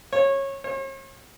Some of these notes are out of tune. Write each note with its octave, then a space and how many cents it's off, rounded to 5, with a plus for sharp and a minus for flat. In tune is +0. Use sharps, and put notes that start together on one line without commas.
C#5 -20
C#5 -45